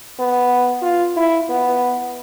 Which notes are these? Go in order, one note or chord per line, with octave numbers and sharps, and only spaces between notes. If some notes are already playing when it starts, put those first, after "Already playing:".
B3
F4
E4
B3